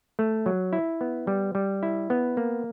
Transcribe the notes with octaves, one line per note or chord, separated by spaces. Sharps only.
A3
F#3
E4
B3
G3
G3
E4
B3
A#3